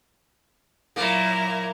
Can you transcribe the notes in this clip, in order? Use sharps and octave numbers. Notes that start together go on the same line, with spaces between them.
A#2 F#3 A#3 E4 A#4